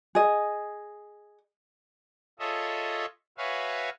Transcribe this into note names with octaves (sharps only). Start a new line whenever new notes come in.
G#4 D#5
F4 G#4 A4 C#5 D#5 E5
F#4 B4 C#5 E5 F5 G#5